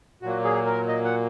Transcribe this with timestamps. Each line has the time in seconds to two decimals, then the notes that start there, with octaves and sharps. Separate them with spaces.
0.22 A#2 F#3 A#3 F#4
0.44 G#4
0.66 A#4
0.88 D#5
1.04 F#5